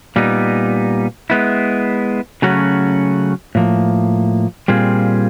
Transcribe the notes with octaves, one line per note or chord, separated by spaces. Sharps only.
A#2 G3 B3 D#4
G#3 B3 E4
C#3 F#3 A3 C#4 F#4
A2 F3 A#3
A#2 G3 C4 F4 G#4